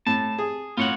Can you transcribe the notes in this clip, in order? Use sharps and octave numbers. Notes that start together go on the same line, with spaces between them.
A2 A5
G#4
A2 F4 C#5 F#5